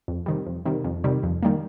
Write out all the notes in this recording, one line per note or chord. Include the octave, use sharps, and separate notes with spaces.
F2
C3 D#3 G3
F2
C3 D#3 G3
F2
C3 D#3 G3
F2
D#3 G3 A#3